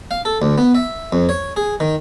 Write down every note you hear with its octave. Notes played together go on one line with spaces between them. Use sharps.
F5
A4
D2
B3
E5
F2
C#5
G#4
D#3